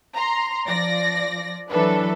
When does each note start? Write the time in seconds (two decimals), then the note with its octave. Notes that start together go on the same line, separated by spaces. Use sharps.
0.14 A#5 C6
0.66 F3 D5 A#6
1.70 E3 F#3 D4 A4 B4